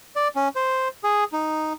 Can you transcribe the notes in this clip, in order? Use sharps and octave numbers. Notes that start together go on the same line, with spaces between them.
D5
C#4
C5
G#4
D#4